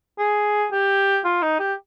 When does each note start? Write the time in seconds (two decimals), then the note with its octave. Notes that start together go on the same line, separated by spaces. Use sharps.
0.19 G#4
0.72 G4
1.25 F4
1.42 D#4
1.59 G4